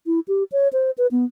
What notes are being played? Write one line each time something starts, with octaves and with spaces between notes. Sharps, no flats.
E4
G4
C#5
C5
B4
B3